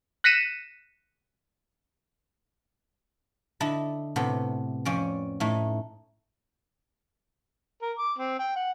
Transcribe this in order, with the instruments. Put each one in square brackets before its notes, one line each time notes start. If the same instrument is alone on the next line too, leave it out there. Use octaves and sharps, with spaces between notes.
[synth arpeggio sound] F#6 A#6 B6 C#7 D#7 E7
[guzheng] D3 E4 A4 D#5 A5 B5
A2 C3 B3 A4
F2 C#4 D5
A2 A3 D#4
[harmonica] A#4
D6
C4
G5
F#5